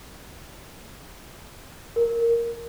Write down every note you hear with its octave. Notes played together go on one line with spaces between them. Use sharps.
A#4